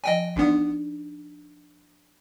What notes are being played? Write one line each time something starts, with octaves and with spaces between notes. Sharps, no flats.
F3 D5 D#5 G5 G#5
A1 B3 D4 D#4 D5